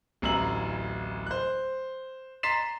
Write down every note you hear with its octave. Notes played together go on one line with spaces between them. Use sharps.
D1 A1 A#5 E6 F#7
C5 F#6
A#5 C6 A6 B6 C7 E7